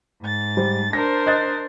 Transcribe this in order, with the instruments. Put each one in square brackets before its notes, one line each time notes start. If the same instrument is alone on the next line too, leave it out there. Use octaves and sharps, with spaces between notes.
[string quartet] G#2 A6
[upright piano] G3 C5
[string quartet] D4 A#4 C5 [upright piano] A#6
[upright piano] D#5 F#6 A6